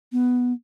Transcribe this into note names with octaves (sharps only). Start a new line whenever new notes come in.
B3